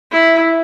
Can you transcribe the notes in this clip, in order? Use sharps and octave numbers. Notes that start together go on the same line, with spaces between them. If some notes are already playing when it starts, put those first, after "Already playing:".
E4